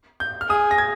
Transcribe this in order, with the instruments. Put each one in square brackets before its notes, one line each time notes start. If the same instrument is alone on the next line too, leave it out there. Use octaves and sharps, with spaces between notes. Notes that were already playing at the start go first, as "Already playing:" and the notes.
[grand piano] G6
F6
[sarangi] G#4 [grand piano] D#6
[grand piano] A#6
G#6